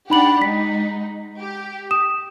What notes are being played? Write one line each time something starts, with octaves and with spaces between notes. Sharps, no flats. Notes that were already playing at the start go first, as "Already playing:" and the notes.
D4 D#4 G4 F#5 B5 F#7
G#3 D#4 B6
G4
D#6 E7